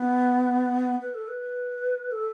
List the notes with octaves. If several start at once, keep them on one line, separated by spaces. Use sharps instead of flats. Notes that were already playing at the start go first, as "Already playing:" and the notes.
Already playing: B3
B4
A4
B4
A4